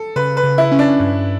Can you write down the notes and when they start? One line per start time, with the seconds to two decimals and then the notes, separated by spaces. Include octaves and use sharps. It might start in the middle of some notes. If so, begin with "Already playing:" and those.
Already playing: A4
0.16 C#3 B4
0.37 B4
0.44 C#3
0.58 E4
0.72 C#4
0.79 D4
1.00 G2